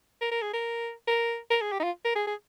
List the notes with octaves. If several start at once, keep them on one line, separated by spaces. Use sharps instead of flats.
A#4
A#4
G#4
A#4
A#4
A#4
G#4
G4
D#4
F4
A#4
G#4
G#4